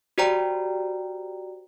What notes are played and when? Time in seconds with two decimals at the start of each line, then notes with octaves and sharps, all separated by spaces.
0.18 F#4 G4 C5 D5 G5 A#5